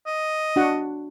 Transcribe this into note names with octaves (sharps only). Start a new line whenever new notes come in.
D#5
D4 F#4 F#5